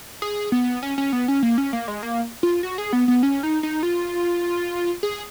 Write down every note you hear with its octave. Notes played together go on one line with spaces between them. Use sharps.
G#4
B3
C#4
C#4
B3
C#4
A#3
C#4
A#3
G#3
A#3
F4
F#4
G#4
B3
B3
C#4
D#4
D#4
F4
G#4